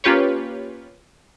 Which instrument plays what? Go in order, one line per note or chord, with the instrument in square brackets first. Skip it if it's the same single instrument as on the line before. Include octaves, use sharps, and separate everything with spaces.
[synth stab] A#3 C#4 F4 G4 B4 C#5